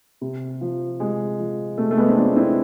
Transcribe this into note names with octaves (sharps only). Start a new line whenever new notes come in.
C3
F3
C3 G#3
F3
C3 A3
A3
G#3 B3
C4
F3 B3 D4
C4 E4